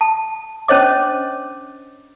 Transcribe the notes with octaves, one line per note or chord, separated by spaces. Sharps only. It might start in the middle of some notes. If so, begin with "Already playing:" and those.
A5
C#4 D4 C5 C#5 D#5 D6